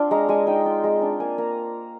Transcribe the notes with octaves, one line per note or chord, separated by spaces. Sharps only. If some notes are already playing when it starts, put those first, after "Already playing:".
Already playing: C4 D4 F4
G#3 A#5
G#3 G#5
D#4 G5
F4
G#3
D4
A#3 G#5
A#3 A#5